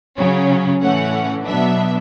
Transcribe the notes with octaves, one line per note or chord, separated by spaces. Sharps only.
C#3 F#3 C#4
A2 E3 A3 C#4 F#5
B2 F#3 B3 D4 E5